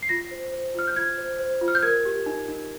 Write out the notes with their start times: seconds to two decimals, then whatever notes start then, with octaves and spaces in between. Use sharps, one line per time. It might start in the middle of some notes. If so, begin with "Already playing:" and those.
0.02 C7
0.09 F4 A#6
0.31 C5
0.52 C5
0.75 F4 F6
0.87 G6
0.96 F4 G#6
1.18 C5
1.39 C5
1.61 F4
1.68 F6
1.75 G6
1.83 A#4 G#6
2.05 G4
2.26 D#4
2.48 D#4